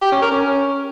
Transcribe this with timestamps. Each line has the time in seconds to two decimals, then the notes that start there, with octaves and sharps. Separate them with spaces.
0.02 G4
0.12 C#4
0.22 A#4
0.32 C#4